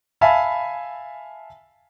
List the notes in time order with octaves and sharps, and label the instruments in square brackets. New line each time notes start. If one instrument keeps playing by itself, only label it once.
[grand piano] E5 F5 G#5 A5 B5